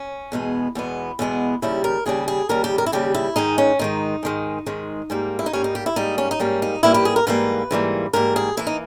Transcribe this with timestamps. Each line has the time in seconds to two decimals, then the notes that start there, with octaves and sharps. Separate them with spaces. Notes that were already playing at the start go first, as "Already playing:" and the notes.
Already playing: C#4
0.32 E2 B2 G#3 B3
0.75 E2 B2 G#3 B3
1.19 E2 B2 G#3 B3
1.62 D#2 C#3 G3 E4
1.84 A#4
2.06 D#2 C#3 G3 G#4
2.28 G#4
2.49 D#2 C#3 G3 A#4
2.64 G4
2.78 A#4
2.86 E4
2.92 D#2 C#3 G3 G4
3.14 E4
3.36 G#2 D#3 G#3 D#4
3.58 C#4
3.79 G#2 D#3 G#3 D#4
4.23 G#2 D#3 G#3
4.66 G#2 D#3 G#3
5.10 G#2 G3 A#3
5.39 E4
5.46 D#4
5.53 G#2 G3 A#3 C#4
5.64 D#4
5.75 G4
5.86 E4
5.96 G#2 G3 A#3 D#4
6.18 C#4
6.31 D#4
6.40 G#2 G3 A#3 C#4
6.62 D#4
6.83 G#2 E3 G3 A#3 E4
6.94 G4
7.05 G#4
7.16 A#4
7.27 G#2 E3 G3 A#3 B4
7.71 G#2 E3 G3 A#3
8.13 G#2 E3 G3 A#3 A#4
8.36 G#4
8.57 E3 A#3 E4
8.67 D#4